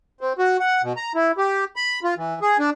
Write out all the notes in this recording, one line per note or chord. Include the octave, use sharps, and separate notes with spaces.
C4
F#4
F#5
B2
A#5
E4
G4
B5
F4
E3
G#4
D4